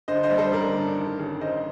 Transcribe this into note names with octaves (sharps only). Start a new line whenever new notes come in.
D3 C5 D#5
C5 D#5
G3
A4 C5
A1 A#4 D5
G2
D#3
A1
A1 C5 D#5